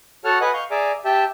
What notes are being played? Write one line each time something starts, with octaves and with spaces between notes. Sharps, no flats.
F#4 A4 C#5 F#5 A5 F6
B4 D#5 F#5 G#5 F#6
F5 C#6 G6
G#4 D5 E5 G#5 A#5 D6
G4 E5 G5 A5